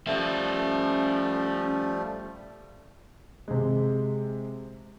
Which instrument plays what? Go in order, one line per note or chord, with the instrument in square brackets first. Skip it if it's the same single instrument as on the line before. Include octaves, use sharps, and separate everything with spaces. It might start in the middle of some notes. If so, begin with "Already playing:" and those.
[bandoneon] F3 G3 A3 [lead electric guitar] C#4 E5
[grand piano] C3 G#3